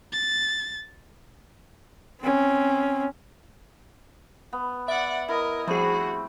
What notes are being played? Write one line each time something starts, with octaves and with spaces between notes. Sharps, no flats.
A6
C4 C#4
B3
D5 E5 F#5
E4 A#4 D#5
F3 G3 A3 C4 F#4 G#4